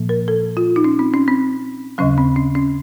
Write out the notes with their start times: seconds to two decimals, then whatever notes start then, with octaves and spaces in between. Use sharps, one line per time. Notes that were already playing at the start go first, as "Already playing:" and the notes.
Already playing: A#2 F3 A#3
0.09 A#4
0.28 A4
0.57 F4
0.76 D#4
0.84 C#4
0.99 C4
1.14 C#4
1.28 C4
1.98 D#2 C#3 F#3 C#4
2.18 C4
2.36 C#4
2.55 C#4